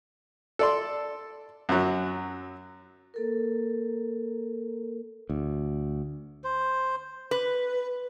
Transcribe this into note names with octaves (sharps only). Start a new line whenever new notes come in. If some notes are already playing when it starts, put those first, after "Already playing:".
A4 D5 C6
F#2 F#3
A#3 A4 A#4
D2
C5
B4